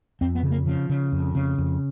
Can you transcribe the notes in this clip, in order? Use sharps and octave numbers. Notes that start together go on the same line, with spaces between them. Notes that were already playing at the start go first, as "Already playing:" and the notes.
F2 C4
B3
C#3
A#3
C#3 F3
C#3
F2
C#3
F2